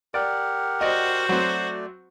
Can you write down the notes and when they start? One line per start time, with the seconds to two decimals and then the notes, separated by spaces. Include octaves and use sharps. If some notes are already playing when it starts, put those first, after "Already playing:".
0.14 G4 A#4 D5 F#5
0.81 F#4 C5 D5 D#5
1.29 F#3 A3 C4 D5